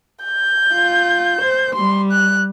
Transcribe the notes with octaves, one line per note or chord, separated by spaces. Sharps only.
G6
F4
C5
G3 C6
F#6